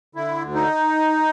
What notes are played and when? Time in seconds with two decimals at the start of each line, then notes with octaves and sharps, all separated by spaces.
0.15 D3 E4
0.42 D2
0.54 D#4